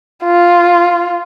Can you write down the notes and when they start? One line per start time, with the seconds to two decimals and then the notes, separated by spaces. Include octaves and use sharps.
0.24 F4